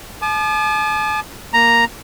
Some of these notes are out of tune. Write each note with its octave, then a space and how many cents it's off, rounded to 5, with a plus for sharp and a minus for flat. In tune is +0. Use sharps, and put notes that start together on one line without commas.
A5 -45 D6 +45
A#3 +0 A#5 +0